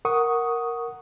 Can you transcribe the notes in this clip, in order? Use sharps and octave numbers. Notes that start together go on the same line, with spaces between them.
A#4 F#5 C#6 D#6